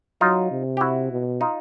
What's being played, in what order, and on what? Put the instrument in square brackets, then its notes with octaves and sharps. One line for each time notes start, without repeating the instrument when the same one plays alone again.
[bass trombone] F#3 [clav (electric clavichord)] D#4 F4
[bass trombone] C3
[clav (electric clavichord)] G4
E4 F#4
[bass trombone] B2
[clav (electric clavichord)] D#4 F4